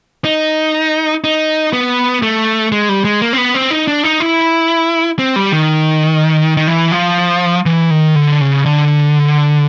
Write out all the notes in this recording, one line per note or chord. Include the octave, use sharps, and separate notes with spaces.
D#4
D#4
B3
A3
G#3
G3
G#3
A#3
C4
B3
C4
D#4
D4
D#4
E4
C4
G3
D#3
D#3
E3
F3
E3
D#3
D3
C#3
D3